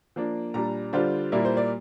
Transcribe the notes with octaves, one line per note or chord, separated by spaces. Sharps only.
F3 A#3 D4
A#2 G3 D4 A#5
D3 G3 D4 F4 C5
A#2 G3 A#3 E4 D5
C5
D5